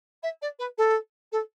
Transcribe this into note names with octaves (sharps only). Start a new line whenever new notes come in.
E5
D5
B4
A4
A4